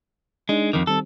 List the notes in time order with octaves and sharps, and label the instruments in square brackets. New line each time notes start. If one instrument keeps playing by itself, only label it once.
[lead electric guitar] G#3 [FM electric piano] D4 D#4
[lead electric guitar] F2 D#3 [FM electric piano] D6
[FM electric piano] D#3 G3 C4 [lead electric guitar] A4